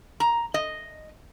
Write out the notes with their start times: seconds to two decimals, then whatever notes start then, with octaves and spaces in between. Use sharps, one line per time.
0.20 A#5
0.54 D#5